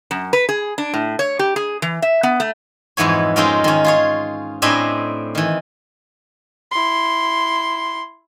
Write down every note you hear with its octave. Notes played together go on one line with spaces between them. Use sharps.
F#2
B4
G#4
D4
A2
C#5
G4
G#4
E3
E5
B3
A3
F2 G#2 E3 B3 C#5
G#3 C4 C#4 D#4 F4 A#4
D#3 C#4
F4 G#4 C#5
A2 C4 D4 D#5 G#5 B5
D#3 E3
E4 C6